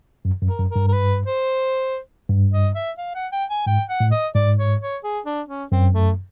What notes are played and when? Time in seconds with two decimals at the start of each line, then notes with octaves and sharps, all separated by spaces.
0.25 F#2
0.42 F#2
0.48 A#4
0.59 F#2
0.71 G2 A#4
0.88 A#4
0.93 B4
1.27 C5
2.30 G2
2.53 D#5
2.75 E5
2.98 F5
3.15 F#5
3.32 G5
3.50 G#5
3.67 G#2 G5
3.89 F#5
4.00 A2
4.11 D#5
4.35 G#2 D5
4.58 C#5
4.81 C#5
5.04 G#4
5.26 D4
5.49 C#4
5.72 F#2 C4
5.94 A3